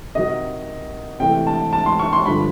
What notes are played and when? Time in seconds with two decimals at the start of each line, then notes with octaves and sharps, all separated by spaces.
0.15 C3 D#3 F#3 D#5
1.20 C3 E3 A3 G5
1.47 A5
1.73 A5
1.86 C6
1.99 C#6
2.13 C6
2.26 G2 D3 F3 B5